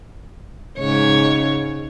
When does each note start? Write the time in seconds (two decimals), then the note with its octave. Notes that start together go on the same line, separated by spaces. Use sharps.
0.79 G#2 C#3 C#5